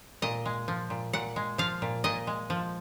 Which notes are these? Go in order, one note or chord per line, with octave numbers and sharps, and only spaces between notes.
A#2 D#5
G#3
F3
A#2
A#2 F#5
G#3
F3 F5
A#2
A#2 D#5
G#3
F3